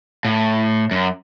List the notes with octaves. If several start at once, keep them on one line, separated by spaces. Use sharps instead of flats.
A2
F#2